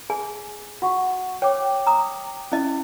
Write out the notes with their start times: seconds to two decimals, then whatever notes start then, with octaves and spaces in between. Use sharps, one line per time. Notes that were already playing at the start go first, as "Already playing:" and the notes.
0.10 G#4 G#5
0.82 F#4 F#5 C#6
1.42 C#5 G5 D6
1.87 A#5 D#6
2.52 C#4 E4 D#5